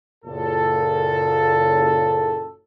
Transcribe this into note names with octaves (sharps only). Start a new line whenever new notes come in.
F#1 A#2 A4